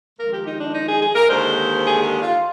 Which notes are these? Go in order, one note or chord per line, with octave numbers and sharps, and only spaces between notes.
F2 D#3 G#3 A#4
G4
D#4
D4
D#4
G#4
G#4
A#4
D#2 D3 G#3 C5
G#4
G4
F4